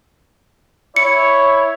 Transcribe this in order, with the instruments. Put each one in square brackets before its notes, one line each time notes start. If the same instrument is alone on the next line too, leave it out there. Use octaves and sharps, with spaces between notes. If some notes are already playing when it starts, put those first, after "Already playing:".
[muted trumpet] E4 [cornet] C#5 [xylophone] C#7